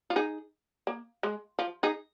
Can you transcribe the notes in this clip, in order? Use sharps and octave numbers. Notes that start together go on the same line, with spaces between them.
F4
D#4 G#4
A#3
G#3
F3
D#4 G#4